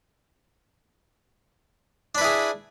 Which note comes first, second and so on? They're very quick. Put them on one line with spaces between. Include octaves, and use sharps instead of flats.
D4 B4 E4 G#4